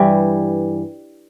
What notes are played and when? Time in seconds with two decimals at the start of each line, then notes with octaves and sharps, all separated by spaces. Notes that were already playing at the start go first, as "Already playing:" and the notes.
Already playing: G2 E3 G3